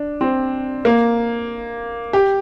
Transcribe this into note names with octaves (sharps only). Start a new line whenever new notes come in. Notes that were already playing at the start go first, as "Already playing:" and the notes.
Already playing: D4
C4
A#3
G4